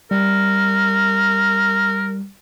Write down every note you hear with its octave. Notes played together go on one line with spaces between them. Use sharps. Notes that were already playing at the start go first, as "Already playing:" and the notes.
G3 A#4